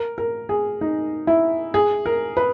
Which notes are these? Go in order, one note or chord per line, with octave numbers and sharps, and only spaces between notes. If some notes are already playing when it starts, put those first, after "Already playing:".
Already playing: A#4
A#4
G#4
D#4
E4
G#4
A#4
B4